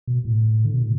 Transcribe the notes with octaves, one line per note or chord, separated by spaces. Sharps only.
B2
A2
D3
B2
A2